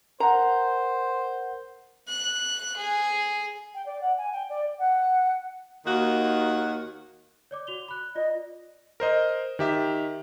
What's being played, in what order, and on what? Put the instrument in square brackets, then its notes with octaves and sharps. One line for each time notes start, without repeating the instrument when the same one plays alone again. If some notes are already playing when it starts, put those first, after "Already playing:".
[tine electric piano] A#4 F#5 [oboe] C5 [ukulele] A#5
[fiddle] F#6
G#4
[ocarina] G5
D5
F#5
G#5
G5
D5
[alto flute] F#5
[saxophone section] D#2 D#3 A#3 F#4
[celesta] C#5 D5 D6
F#4 F7 G7
B5 F#6
[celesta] F4 D5 [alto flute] D#5
[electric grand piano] A#4 C5 D#5
D#3 G4 E5